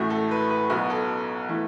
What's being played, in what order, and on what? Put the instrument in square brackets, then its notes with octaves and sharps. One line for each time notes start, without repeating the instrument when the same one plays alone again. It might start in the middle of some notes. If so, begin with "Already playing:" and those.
Already playing: [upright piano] A1 A2 A3 F#4
A4
B4
B4
B1 B2 F#3 B3 F#4
A4
E3 A3